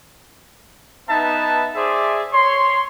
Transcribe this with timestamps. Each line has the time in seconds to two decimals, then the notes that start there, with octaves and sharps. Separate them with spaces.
1.08 B3 D#4 B4 E5 A5
1.76 G#4 C5 D5 E5
2.33 C#5 C6